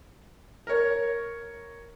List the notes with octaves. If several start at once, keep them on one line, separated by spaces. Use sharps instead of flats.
A#4 C#5